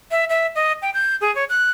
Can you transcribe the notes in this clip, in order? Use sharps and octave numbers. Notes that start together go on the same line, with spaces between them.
E5
E5
D#5
G5
G6
G#4
C#5
F#6